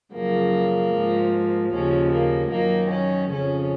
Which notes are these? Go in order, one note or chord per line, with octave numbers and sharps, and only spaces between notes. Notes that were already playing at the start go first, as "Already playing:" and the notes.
F#2 C#3 F3 A#3
G#2 F3
D#2 C#3 F3 C#4
A#3
F#2 D#3 A#3
C#4
F2 C#3 F3 C#4